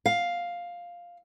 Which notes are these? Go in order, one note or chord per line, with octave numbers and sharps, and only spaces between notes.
F5